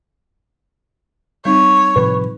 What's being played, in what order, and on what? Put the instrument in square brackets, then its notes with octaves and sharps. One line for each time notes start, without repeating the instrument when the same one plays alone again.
[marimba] G3 C4 D#4 [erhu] C#5
[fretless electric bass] A2 C3 F3 [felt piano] B4